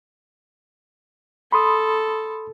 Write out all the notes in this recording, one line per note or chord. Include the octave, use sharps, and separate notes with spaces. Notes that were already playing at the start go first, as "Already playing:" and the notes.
A4 B5 C6 D#6